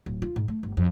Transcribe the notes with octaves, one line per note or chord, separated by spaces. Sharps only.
D1
F4
G#2
A3
G1
F2